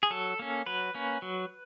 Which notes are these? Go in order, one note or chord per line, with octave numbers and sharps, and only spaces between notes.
G#4
F#3 A4
A#3 C#4
F#3 B4
A#3 C#4
F#3